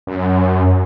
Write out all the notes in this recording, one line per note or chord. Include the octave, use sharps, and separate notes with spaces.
F#2